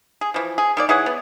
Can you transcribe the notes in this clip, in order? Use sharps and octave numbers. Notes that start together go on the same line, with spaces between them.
G#4
E3 F3
G#4
D#3 A#3 D5
E3 G#4 C#5 F#5
B3